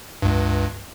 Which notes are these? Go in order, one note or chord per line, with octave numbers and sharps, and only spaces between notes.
C#2 G2